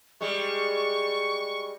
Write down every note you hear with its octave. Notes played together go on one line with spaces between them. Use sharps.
G3 G#3 C#6